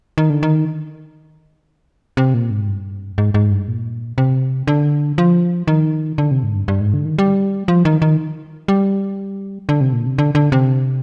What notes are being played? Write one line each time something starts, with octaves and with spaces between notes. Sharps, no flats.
D#3
D3
D#3
C3
A#2
G#2
G2
G#2
G#2
G2
A#2
C3
D3
F3
D#3
D3
C3
G#2
G2
G2
G#2
D3
D#3
G3
F3
D#3
D#3
G3
D3
C3
A#2
C3
D3
D3
C3